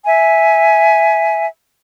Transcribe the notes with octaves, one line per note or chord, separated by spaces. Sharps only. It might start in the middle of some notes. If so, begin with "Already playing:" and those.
E5 G#5